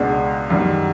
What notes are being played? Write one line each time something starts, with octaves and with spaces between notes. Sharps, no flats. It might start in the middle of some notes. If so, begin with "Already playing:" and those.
Already playing: C#2 B2 G#3 B3 D4
F#2 D#3 G3